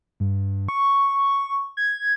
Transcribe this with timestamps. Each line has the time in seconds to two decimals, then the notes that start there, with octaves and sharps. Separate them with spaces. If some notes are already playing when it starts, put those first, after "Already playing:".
0.20 G2
0.69 C#6
1.77 G#6